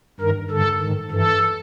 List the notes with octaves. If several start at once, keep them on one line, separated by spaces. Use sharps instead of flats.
G2 D#3 A#4
G2 D3 A4
G#2 D#3
G2 E3 A4